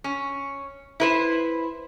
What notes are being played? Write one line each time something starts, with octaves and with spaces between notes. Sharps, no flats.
C#4
E4 B4 C5